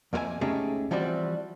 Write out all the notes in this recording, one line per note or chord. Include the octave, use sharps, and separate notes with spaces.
F2 A#3 F4 A#4 E5 G#5
C#2 A3 C#4 D#4 G4 G#4
E3 F3 G3 C4 F#4 D5